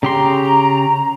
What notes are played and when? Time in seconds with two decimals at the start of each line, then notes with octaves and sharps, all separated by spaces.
0.03 C#3 G4 A#5 C6